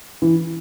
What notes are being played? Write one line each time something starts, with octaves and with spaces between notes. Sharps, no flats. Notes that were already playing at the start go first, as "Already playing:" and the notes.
E3